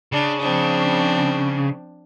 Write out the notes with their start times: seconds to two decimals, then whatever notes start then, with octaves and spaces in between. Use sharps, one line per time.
0.12 C#3 D4
0.41 F3 C4 D4